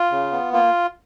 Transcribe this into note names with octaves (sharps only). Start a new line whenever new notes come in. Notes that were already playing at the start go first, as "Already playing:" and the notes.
Already playing: F4
C#3
B3
A#3 F4